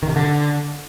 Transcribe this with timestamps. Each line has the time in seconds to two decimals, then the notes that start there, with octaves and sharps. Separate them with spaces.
0.03 D#3
0.09 C3
0.16 D3